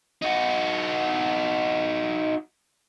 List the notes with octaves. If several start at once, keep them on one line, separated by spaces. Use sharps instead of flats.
D#4 F#4